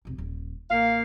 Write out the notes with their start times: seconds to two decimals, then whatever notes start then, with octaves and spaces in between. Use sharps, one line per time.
0.05 F1 B1
0.18 D#1
0.70 A1 A#3 F5